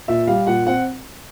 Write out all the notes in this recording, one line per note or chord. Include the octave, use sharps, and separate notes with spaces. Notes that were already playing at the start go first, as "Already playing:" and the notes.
A#2 E5
G3 F5
A#2 F#5
C4 F#5